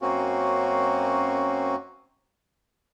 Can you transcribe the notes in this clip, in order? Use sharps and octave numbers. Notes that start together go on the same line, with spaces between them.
F#2 A#3 C4 C#4 F#4